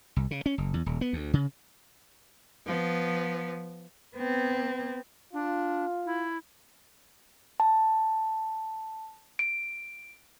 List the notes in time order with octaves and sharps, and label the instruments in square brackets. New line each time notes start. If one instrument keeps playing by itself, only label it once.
[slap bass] C2
C#3
C#4
F#1
E2
D#1
B3
D2
C#3
[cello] F3 B3
B3 C4
[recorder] D4 [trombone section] F4
[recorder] E4
[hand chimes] A5
D7